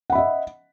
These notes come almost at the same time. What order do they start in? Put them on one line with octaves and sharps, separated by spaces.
F#5 B5 E5 D#5